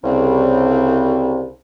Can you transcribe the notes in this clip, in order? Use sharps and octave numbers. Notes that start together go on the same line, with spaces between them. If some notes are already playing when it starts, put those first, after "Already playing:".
C2 C#3 C4